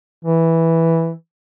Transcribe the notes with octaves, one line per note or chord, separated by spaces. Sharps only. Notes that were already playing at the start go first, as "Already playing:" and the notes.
E3